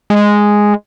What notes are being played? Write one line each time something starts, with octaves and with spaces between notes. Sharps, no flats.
G#3